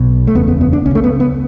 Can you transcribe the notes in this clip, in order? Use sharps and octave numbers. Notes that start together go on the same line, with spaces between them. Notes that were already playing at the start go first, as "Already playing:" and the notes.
Already playing: B1 B2
A3
F#1 E2 C#3 B3
B3
B3
D4
C#2 C#4
C#3 A3
B3
B3